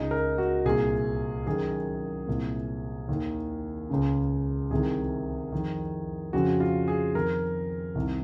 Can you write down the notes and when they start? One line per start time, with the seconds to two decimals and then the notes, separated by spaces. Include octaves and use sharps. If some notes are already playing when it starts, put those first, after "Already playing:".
Already playing: C#2 C#3 D#4
0.11 A#4
0.38 F#4
0.65 C2 A#2 G#4
1.47 F#2 D#3 G#4
2.27 C2 A#2
3.08 D#2 D#3
3.90 C#2 C#3
4.71 C2 C3 D#3 G#4
5.52 F2 D#3
6.33 F2 C#3 F#4
6.60 F4
6.88 G#4
7.15 F2 D#3 A#4
7.95 C2 C3 D#3